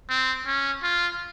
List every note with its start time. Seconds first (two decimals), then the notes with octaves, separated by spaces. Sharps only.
0.09 C4
0.47 C#4
0.83 F4